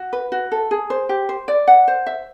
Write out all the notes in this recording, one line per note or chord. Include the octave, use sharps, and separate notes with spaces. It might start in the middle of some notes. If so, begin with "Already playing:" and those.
Already playing: F#4
B4
F#4
A4
G#4
C5
G4
C5
D5
F#5
C5
E5